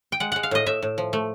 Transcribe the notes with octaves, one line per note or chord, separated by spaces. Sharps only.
G5
G#3 F#5
G#3 F#5
F5
A2 D#5
A2 E5
A2
F3
A3